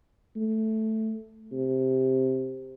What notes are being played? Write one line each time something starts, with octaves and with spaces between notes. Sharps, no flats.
A3
C3